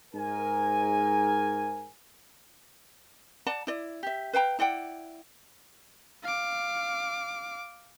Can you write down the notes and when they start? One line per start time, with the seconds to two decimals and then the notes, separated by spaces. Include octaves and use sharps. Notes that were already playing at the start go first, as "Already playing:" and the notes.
0.14 G#2 A#4 G#5
3.46 D5 F#5 A5 A#5
3.67 E4 D5
4.03 G4 E5
4.33 B4 F5 G5 A#5
4.59 E4 D5 F#5 G5
6.23 F5 D6